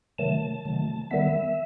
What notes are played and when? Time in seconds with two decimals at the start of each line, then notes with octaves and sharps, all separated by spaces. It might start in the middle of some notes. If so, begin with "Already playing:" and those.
0.18 C3 D#3 F#3 A3 A5
0.65 C3 D#3 F#3 A3
1.11 D#3 G3 B3 E5